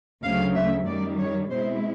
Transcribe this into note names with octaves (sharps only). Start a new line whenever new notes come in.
D2 C#3 F#3 A3 F5
E5
F#2 D#3 G3 D5
C#5
B2 G#3 C4 E4 C5